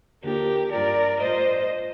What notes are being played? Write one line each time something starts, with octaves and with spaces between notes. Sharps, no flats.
D#2 D3 F3 G4 A#4
G2 F3 A#4 D5
A2 F3 C5 D#5